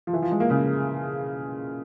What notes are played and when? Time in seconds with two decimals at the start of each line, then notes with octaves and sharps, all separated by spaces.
0.07 F3
0.13 E3
0.22 F3
0.31 G#3
0.40 A#3
0.50 C#3